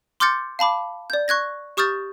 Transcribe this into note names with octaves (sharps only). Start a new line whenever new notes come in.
C6 D6 F6 G6 A6 C#7
F5 A5 B5 D6
D5 G6
C#6 F#6 G#6 A#6
G4 C#6 D#6 F6 G6 A6